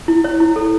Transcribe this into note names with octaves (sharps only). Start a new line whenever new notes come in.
E4
C#5
E4
A4